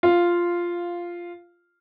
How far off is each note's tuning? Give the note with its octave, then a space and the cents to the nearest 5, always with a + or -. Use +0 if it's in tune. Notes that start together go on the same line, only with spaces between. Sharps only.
F4 -5 F5 +0